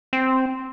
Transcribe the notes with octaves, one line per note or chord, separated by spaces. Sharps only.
C4